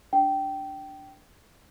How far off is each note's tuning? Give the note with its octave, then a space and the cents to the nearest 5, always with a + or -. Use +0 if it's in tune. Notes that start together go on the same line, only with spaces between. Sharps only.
D4 +0 G5 -15